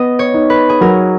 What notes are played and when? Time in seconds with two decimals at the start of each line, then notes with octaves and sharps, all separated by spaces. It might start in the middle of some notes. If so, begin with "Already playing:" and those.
Already playing: B3 D#5
0.19 C#5
0.34 D#4
0.50 B4
0.69 G#4
0.81 F#3 A#4